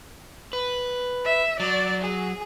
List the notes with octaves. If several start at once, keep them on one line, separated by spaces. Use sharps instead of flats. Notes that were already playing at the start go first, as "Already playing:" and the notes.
B4
E5
F#3 D5
G#4